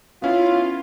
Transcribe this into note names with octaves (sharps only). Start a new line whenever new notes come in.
B3 C#4 E4 F4 F5